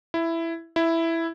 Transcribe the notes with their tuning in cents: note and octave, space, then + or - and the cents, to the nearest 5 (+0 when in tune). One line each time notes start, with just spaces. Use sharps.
E4 +10
E4 +5